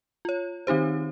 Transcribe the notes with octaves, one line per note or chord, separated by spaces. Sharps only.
F4 C#5
D#3 C4 D#4 G4 C5